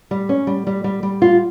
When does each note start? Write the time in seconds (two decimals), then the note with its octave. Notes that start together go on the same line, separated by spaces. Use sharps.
0.11 G3
0.29 C#4
0.47 G3
0.67 G3
0.84 G3
1.03 G3
1.22 F4